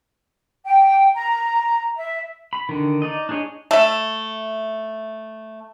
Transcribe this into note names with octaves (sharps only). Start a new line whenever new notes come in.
G5
A#5
E5
B5
D3 D#3
D#4 D5 D#5
D4 D#4 G#4 C#5 D#5
A3 E5